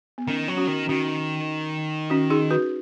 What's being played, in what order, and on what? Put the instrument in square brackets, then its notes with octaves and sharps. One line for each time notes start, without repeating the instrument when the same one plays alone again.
[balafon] B3
[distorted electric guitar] D#3 [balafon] C#4
[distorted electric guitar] F#3
[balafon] C#4 F#4
[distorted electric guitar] D#3
[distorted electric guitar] D#3 [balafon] C#4 F#4
[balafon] C#4 F#4
D#4 G#4
F#4 B4